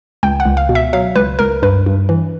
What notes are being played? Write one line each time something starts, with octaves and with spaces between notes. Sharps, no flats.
C#2 G5
F#5
C#2
F5
B2
E5
F#3 F5
C#2 B4
C#2 A#4
G2 B4
G2
E3